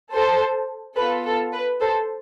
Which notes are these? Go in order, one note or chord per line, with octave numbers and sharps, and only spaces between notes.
A4 C5
B3 F4 A4 B4
A4
B4
A4 C5